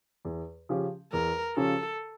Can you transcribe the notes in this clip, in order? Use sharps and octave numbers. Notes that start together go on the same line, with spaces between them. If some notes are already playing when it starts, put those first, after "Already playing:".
E2
C#3 F3 C#4 G4
E2 A#4
C#3 F3 C#4 G4 A4